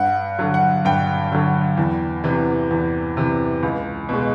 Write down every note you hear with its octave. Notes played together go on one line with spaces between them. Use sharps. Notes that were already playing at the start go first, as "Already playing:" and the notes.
Already playing: G2 F#5
D3 F#3
F#5
G2 G5
D3 F#3
E2
C3 E3
E2
C3 E3
C#2
B2 G#3